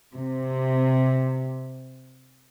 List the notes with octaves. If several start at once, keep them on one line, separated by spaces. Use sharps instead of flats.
C3